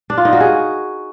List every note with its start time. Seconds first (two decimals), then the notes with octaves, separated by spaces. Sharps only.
0.10 D4
0.17 F4
0.25 D#4
0.33 F#4
0.40 G#4